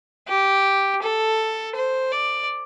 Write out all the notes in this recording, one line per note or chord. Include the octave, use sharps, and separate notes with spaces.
G4
A4
C5
D5